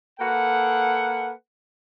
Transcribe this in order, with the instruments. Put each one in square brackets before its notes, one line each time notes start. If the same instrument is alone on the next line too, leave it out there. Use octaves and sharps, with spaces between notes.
[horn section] A#3 A4 B4 F#5